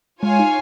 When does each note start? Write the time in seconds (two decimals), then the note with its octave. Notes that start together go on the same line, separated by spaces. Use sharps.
0.22 G#3 F4 C#5 F5 G#5
0.39 D#4